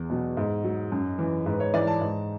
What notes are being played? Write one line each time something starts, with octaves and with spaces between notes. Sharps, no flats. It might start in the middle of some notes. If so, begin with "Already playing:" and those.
Already playing: E2
B2 F#3
G#2
F#3
F#2
E3
G#2 B4
C#5
E3 D5
A5
G#2